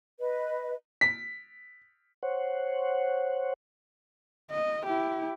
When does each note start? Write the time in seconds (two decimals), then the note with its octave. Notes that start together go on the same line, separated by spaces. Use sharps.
0.19 B4 D#5
1.01 B6
2.23 C5 C#5 F#5
4.51 D#5
4.86 E4 G4